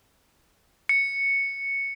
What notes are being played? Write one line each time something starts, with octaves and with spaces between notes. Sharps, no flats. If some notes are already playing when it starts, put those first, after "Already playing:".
C#7